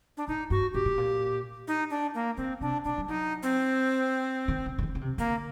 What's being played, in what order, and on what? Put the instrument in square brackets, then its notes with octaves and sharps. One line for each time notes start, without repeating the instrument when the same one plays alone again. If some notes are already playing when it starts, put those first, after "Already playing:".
[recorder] D4
[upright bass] A2 [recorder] D#4
[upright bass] G2 [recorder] F#4
[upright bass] A2 [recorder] G4
[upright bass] A2
A#2
[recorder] D#4
D4
A#3
[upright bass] D3 [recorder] C4
[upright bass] C3 [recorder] D4
[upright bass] A#2 [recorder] D4
[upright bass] G3
[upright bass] F#3 [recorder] D#4
[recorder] C4
[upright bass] D#3
D3
D3
D#3
D3
C3
[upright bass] D3 [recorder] A#3